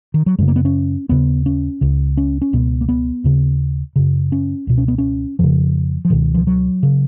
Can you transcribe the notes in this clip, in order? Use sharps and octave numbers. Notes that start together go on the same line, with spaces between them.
D#3
F#3
F#2 C#3 G#3
A#3
B3
C#4
D#2 C#3 B3
C#4
C#2 C#3
C#4
C#4
C#2 B2 B3
A#3
B3
D#2 C#3
F#2 C#3
C#4
C#2 B2
C#4
B3
C#4
F2 C#3 F3
F3
C#2 B2 D#3
F3
F#3
C#3